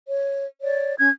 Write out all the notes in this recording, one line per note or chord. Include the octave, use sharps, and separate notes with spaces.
C#5
C#5 D5
C#4 G#6